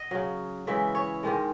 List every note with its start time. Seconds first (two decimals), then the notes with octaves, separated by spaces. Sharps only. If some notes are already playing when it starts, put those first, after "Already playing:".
Already playing: D#5 F#5
0.11 C#3 F#3
0.67 C#3 E3 G#3 E5
0.95 C#5
1.23 G#2 D#3 G#3